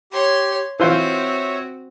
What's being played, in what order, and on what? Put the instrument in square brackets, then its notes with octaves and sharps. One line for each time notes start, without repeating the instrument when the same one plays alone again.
[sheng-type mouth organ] G4 [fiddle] C#5 C6
[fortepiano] E3 F4 C5 [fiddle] C4 F#4 [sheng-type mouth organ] C#5 E5